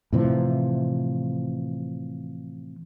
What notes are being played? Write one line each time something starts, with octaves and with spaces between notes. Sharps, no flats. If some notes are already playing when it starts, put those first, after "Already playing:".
A2 C3 E3 F3